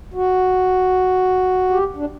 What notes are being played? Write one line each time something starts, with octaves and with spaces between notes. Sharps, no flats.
F#4
G4
D4